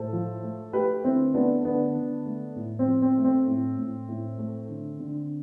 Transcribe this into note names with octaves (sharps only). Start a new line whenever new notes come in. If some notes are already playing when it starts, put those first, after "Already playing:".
Already playing: A2 A4 C5
F3
A3
A3 G4 B4
D3 C4 E4
A3 B3 D4
D3 B3 D4
D3
A3
A2
C4
F3
C4
A3
C4
A2
A2
A2
A3
D3
D3